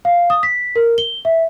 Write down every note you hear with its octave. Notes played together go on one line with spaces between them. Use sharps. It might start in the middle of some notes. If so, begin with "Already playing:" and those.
F5
D#6
B6
A#4
G7
E5